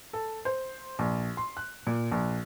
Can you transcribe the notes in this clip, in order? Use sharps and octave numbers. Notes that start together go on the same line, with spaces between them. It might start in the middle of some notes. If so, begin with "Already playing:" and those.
A4
C5
A#1
C6
F#6
A#2
A#1